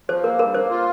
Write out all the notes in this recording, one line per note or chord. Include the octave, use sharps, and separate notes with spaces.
F3 C5
A#3 A#4
G2 A#4
A#3 C5
F4